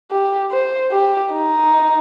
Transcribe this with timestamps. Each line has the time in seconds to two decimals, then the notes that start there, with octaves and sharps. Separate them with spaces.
0.11 G4
0.51 C5
0.92 G4
1.32 D#4